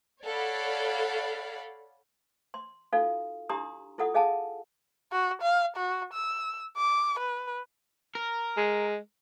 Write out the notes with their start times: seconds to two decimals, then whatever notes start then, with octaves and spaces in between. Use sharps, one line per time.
0.23 A4 C#5 D5 F5 F#5 B5
2.54 C6
2.93 D#4 F4 F#4 A4 F5
3.49 D4 E4 G4 A#5 C6 D#6
3.98 E4 F4 A4 F#5 D#6
4.14 G#4 D#5 F5 G#5 A5
5.12 F#4
5.42 F5
5.76 F#4
6.13 E6
6.76 D6
7.19 B4
8.15 A#4
8.57 G#3